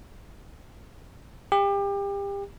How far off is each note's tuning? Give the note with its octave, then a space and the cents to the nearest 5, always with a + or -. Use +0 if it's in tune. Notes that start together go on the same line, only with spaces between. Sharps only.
G4 +30